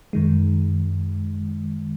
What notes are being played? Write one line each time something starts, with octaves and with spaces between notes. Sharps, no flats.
F#2 D#3 G#3